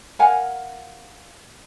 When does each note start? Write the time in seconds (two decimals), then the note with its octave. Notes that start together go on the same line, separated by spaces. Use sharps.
0.19 A#4 F5 F#5 G#5